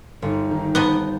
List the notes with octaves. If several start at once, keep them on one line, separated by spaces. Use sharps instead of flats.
G1 D#4
D#3
B3 C5 D#5 G5 A5